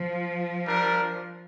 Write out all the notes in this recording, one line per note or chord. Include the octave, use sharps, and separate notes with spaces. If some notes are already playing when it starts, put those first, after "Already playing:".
Already playing: F3
G3 D4 A#4